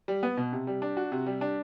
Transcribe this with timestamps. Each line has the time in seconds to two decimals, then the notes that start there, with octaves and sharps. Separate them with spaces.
0.08 G3
0.23 B3
0.37 B2
0.53 C3
0.67 G3
0.82 D4
0.97 F#4
1.12 C3
1.26 G3
1.41 D4